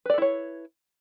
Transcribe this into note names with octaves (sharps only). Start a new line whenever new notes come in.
E4 A4 B4 C#5 D5